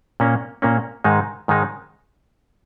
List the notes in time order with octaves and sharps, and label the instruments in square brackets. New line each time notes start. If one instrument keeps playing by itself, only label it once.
[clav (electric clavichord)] A#2 A#3 C#4
A#2 A#3 C#4
G#2 D#3 G#3 D#4
G#2 D#3 G#3 D#4